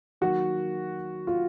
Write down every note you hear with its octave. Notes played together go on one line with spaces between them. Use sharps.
D#3 F#3 A#3 F#4
F4